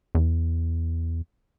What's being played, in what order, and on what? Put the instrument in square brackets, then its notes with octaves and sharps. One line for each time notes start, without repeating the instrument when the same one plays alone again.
[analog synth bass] E2